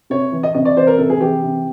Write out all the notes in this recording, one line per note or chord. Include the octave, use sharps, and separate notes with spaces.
C3 C#5
E3
D#5
C3 D#5
D5
E3 C5
A#4
C3 A4
G#4
E3 G4
C3